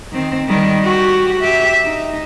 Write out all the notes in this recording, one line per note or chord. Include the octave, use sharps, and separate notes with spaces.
D#3 C4
D#3 G3
F#4 G4
G4 E5
D#4